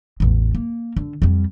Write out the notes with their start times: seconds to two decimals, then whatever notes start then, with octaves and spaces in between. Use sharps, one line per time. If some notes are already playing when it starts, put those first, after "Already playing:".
0.20 A1 E2
0.55 A#3
0.96 D3
1.22 F2 G3